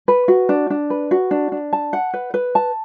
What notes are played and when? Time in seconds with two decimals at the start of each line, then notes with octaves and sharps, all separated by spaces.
0.08 B4
0.28 F#4
0.49 D4
0.70 D4
0.90 B4
1.11 F#4
1.31 D4
1.52 D4
1.73 A5
1.93 F#5
2.13 B4
2.34 B4
2.55 A5